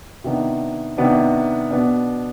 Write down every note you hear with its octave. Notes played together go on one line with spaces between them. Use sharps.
C3 D#3 B3 D4
C3 D#3 B3 D4
B2 B3 D4